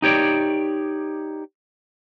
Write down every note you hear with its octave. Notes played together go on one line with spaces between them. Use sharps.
D#4 G4 C#5 D5